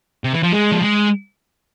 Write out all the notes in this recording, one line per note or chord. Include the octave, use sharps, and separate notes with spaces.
C3
E3
F3
G#3
F3
G#3